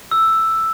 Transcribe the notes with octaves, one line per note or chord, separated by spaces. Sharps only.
E6